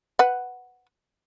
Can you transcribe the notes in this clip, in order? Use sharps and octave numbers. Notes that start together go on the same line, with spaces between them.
B4 F#5